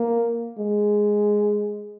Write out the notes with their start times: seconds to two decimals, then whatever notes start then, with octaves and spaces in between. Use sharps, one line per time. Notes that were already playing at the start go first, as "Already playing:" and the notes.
Already playing: A#3
0.58 G#3